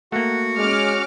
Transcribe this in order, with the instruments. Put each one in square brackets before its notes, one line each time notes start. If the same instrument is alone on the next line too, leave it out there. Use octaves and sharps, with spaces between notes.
[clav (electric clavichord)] A3 A#3 [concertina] F#4 F#5
[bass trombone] G#3 [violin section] C#4 D6 F6